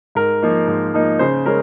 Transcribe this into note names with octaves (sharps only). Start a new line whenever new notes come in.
G#2 A#4
F3 A#3 D#4
G#2
F3 A#3 D#4
C#3 C5
G#3 C#4 A#4